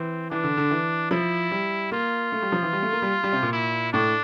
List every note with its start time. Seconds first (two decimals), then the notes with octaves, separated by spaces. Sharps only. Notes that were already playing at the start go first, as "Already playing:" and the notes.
Already playing: E3 C4
0.31 E3 D4
0.44 D3
0.57 D3
0.71 E3
1.11 F3 E4
1.51 G3
1.91 A#3 F4
2.32 A3
2.42 G3
2.52 F3
2.63 E3
2.73 G3
2.82 A3
2.93 A#3
3.02 G3
3.23 G3
3.33 C3
3.43 A#2
3.53 E4
3.93 A2 D4